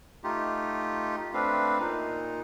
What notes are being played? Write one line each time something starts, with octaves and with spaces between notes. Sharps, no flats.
A3 D#4 F4 G4
A3 C4 D4 B4 F5
A#2 D#4